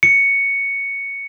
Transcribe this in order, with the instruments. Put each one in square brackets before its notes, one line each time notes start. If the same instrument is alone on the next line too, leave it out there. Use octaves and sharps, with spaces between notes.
[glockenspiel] C#7